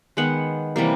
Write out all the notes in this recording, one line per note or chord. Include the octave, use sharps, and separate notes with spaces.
D#3 G#3 B3 F#5
C3 E3 G3 A#3